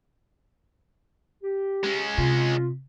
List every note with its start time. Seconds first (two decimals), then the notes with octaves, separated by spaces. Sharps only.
1.43 G4
1.83 G#3 C#4
2.18 C3 F4